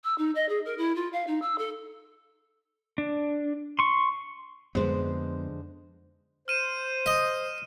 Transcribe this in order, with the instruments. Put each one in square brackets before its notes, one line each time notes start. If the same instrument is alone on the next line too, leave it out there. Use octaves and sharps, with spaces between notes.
[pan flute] E6
D#4
D#5
G#4
A#4
E4
F4
F5
D#4
E6
A4
[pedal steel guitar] D4
C6 C#6
[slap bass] F2 B3 [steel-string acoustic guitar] D3 G#3 C5
[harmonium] C5 [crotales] F6 D#7 E7
[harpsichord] D#5